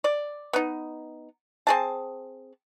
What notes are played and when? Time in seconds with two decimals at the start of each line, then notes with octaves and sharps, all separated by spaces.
0.04 D5
0.53 B3 D#4
1.67 C4 G#4 A5